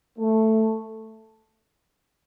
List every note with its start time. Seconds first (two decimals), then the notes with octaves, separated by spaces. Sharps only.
0.18 A3